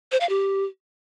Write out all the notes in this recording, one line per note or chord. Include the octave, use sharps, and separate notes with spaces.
C5
F5
G4